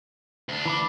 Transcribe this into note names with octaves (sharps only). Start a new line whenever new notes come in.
D2 D4
E3 B5 D6